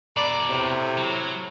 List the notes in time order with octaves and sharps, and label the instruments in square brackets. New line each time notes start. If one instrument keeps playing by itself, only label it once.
[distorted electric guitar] B2 E4 [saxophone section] A4 B4 D5 [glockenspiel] A#5 B5
[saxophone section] A2 [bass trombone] C3
[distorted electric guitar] F#3